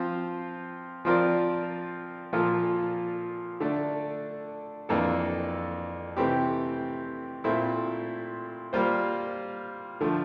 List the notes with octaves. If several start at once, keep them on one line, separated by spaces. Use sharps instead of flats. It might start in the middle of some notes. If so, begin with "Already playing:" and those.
Already playing: F3 C4 F4 C5
F3 C4 F4 A#4 D5
A#2 F3 A#3 F4 A4
D3 A3 D4
F2 E3 A#3 D4 A4
C3 E3 A3 C4 G4
A#2 A3 C4 E4
G3 A#3 F4 C5
D3 F3 A3